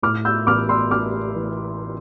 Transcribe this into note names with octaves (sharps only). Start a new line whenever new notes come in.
A2 D6 F6
E6 G6
A1 D6 F6
C6 E6
A1 D6 F6
E3